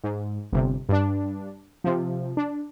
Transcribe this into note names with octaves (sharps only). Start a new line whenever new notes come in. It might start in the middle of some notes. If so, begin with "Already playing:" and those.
G#2
G1 C3
G2 D4
C3 F3
D4